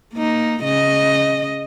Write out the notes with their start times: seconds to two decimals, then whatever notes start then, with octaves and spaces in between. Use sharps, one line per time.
0.14 A#3 D#4
0.63 C#3 D#5